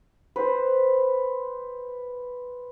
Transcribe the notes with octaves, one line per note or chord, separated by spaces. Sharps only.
B4 C5